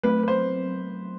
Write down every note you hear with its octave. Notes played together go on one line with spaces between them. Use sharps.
F#3 A3 C4 B4
B4
C5